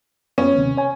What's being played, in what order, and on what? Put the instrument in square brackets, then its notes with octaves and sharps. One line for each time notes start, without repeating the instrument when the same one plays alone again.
[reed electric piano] F#2 B3 C#5 [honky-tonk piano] C#4
[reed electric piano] D#2 C3
C#5 G#5